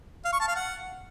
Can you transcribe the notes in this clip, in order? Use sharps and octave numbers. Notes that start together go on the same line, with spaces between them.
F5
C#6
A5
F5
F#5